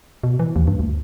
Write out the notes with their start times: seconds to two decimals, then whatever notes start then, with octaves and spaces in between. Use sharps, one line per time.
0.24 B2
0.39 E3
0.56 D#2
0.67 G2
0.79 D2